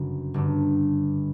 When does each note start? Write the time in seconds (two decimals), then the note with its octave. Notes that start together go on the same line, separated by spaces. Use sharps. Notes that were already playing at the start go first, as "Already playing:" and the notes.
Already playing: G1 F#2 C#3
0.34 G1 G2 D3